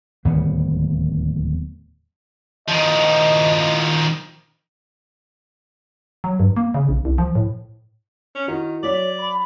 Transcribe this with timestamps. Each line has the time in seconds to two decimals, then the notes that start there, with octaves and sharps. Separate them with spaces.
0.25 D1 D#2 G3 B3
2.68 D#3 F3 D#5
6.24 F#3
6.40 G2
6.57 A#3
6.74 C#3
6.89 A#1
7.05 C2
7.18 F3
7.35 A2
8.35 C#4
8.48 D#3 E4 F#4
8.83 F#3 C#5 D5 B6
9.19 B5